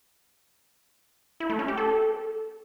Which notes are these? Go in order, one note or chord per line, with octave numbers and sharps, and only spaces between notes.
E4
A3
C#4
G4
A4